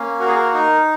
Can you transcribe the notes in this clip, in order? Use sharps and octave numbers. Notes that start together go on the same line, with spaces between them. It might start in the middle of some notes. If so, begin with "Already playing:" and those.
Already playing: A#3 C#4
F#4 A#4
G#4
A#4
D#4 A#4